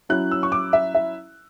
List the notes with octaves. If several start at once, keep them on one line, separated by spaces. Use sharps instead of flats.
F#3 C#4 E4 F#6
E6
C#6
D6
E5
E5